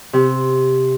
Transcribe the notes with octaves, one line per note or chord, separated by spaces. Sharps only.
C3